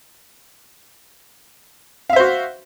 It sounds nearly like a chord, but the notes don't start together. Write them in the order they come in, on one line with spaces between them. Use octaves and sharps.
F5 E5 C5 F#4